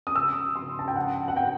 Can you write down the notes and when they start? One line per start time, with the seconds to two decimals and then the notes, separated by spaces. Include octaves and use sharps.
0.07 D#6
0.15 E6
0.55 C6
0.79 A5
0.88 G5
0.96 F#5
1.28 F#5
1.36 G5